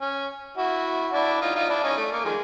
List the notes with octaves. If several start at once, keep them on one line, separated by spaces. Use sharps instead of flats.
C#4
E4 F#4
D4 E4
D#4 F4
D#4 F4
D4 E4
C#4 D#4
A3
A#3
D#3 F3 G#3